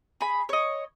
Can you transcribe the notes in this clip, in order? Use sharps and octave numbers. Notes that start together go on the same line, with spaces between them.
G#4 B5
C#5 D#5